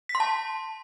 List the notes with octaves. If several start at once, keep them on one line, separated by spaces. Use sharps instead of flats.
B6
C6
A5